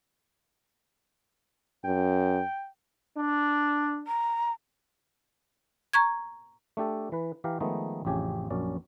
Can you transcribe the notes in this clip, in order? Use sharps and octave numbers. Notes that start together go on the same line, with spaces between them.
F#2 G5
D4
A#5
A#5 C#6 G#6
A3 D4 G4 A4
E3 B4
E3 G4 F5 F#5 A#5
D#3 F3 G#3 A3 B3 D#4
A1 F2 C#3 G4 G#5
A#1 F#2 C#4 D5